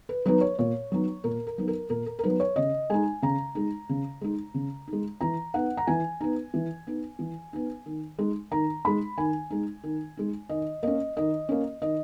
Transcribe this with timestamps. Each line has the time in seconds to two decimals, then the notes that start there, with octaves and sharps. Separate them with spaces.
0.09 B4
0.26 F#3 B3 D#4 B4
0.41 C#5
0.59 A#2 C#5
0.92 F#3 B3 D#4
1.24 A#2 A#4
1.47 A#4
1.58 F#3 B3 D#4
1.68 A#4
1.90 A#2 A#4
2.06 A#4
2.19 A#4
2.23 F#3 B3 D#4 B4
2.40 C#5
2.56 C#3 D#5
2.90 G#3 D#4 G#5
3.22 C#3 A#5
3.55 G#3 D#4
3.89 C#3
4.21 G#3 D#4
4.54 C#3
4.88 D#4
4.93 G#3
5.21 E3 A#5
5.54 B3 D#4 F#5
5.77 A#5
5.87 E3 G#5
6.21 B3 D#4
6.54 E3
6.87 B3 D#4
7.19 E3
7.53 B3 D#4
7.86 D#3
8.19 G#3 D#4
8.51 D#3 A#5
8.85 G#3 D#4 B5
9.17 D#3 G#5
9.50 G#3 D#4
9.84 D#3
10.17 G#3 D#4
10.49 D#3 D#5
10.83 A#3 C#4 D#5
11.17 D#3 D#5
11.49 A#3 C#4
11.82 D#3 D#5